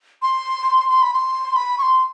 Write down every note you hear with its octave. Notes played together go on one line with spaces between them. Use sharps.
C6
C6
B5
C6
B5
C#6
C6